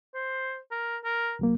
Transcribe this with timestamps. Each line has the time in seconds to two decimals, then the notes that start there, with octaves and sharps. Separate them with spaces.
0.14 C5
0.71 A#4
1.04 A#4
1.39 C2 F#3 A#3